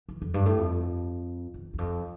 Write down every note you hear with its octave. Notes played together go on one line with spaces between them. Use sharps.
E3
F2
G2
A2
F2
E2
E2
F2